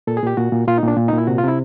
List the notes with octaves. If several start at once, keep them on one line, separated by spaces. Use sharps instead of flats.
A#2 A4
G#4
A#2 G4
A#2 F#4
A#2
A#2 F4
D#4
A#2 D4
A#2
D#4
A#2
E4
C3 F#4
F4
C3 E4